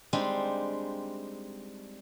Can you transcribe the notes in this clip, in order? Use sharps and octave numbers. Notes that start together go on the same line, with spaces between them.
G3 G#3 C4 D4 D#4